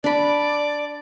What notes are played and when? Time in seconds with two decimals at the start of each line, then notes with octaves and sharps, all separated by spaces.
0.04 D4 D5 B5